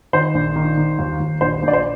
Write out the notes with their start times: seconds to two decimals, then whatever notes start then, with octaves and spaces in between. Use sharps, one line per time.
0.13 D#3 C5
0.34 A#1
0.56 D#3
0.77 D#3
0.99 D#2
1.20 D#2
1.41 A#1 C5
1.63 A#1
1.68 D5
1.73 C5